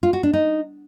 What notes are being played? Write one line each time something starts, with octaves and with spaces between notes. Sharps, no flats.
F4
F#4
D4
D#4